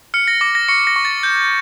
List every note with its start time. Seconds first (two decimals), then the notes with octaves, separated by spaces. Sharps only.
0.14 F6 C#7
0.28 A#6
0.41 D6 A#6
0.55 A#6
0.68 C#6 C#7
0.87 A#6
0.96 C#6
1.05 A6
1.23 G6